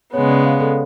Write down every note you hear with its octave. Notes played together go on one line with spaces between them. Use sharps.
C#3 G#3 B3 C#5
D5
F5
A4